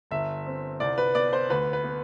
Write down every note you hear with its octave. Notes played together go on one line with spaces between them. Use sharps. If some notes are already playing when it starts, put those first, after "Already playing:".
G1 E5
C4
C2 D5
B4
B3 D5
C5
D2 B4
B4
B3